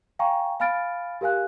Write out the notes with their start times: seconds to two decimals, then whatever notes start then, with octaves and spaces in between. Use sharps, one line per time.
0.19 F5 G5 G#5 A#5 C#6
0.60 F5 G#5 B5 F6 A6 D7
1.21 G4 A#4 F5 G#5 F#6